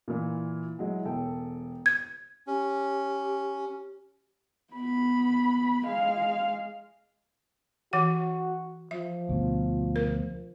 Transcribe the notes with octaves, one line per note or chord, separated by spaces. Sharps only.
A#2 E3
F#3 G#3 E4
E1 A4 G5
G#6
C#4 G4
B3 B5
G#3 F5
E3 F#4 F#5
F3 E5
D2 B2
A#4